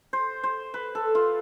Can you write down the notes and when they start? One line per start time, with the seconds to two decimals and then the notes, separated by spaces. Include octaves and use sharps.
0.13 C5
0.43 C5
0.74 B4
0.95 A4
1.15 F4